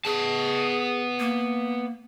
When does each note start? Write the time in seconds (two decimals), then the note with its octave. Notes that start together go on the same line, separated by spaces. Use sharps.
0.05 B3 G#4 A5
1.20 A#3